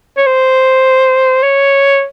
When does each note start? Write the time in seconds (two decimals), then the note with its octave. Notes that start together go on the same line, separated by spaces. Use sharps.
0.17 C#5
0.27 C5
1.43 C#5